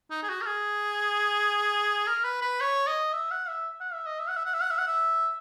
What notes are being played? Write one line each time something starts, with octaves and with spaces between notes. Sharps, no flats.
D#4
G#4
F#4
A#4
G#4
A#4
B4
B4
C#5
D#5
E5
F#5
E5
F#5
E5
D#5
E5
F#5
E5
F#5
E5
F#5
E5
F#5
E5